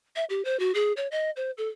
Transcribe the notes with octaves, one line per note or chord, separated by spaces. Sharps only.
E5
G4
C5
F#4
G#4
C#5
D#5
C5
A4